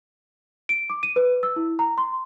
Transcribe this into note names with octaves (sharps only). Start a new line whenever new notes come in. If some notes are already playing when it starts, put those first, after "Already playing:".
D7
D6
D#7
B4
E6
E4
A#5
C6